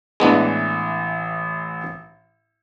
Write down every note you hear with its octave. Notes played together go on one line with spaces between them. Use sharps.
A1 E3 G#3 B3 D4